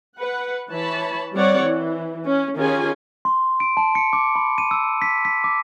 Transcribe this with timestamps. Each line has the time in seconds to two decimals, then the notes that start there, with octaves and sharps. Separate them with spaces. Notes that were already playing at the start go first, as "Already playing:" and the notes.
0.19 B4 F#5
0.71 E3 C#5 A5 B5
1.35 G3 C4 C#5 D5 F#5
1.66 E3
2.26 C#4
2.57 D#3 C#4 F4 G4 G#4 G#5
3.25 C6
3.60 D7
3.77 A5
3.95 C#7
4.13 D6
4.35 B5
4.58 D#7
4.71 E6
5.02 B6
5.25 B6
5.44 D6